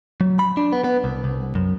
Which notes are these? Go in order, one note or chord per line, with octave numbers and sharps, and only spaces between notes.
F#3
B5
D4
B3
B3
C2
C2
F#2